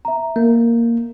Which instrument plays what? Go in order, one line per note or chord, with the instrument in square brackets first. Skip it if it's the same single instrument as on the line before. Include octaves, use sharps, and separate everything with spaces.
[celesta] E5 A#5
[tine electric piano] A#3 [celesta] A#4